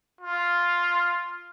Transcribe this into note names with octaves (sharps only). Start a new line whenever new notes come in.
F4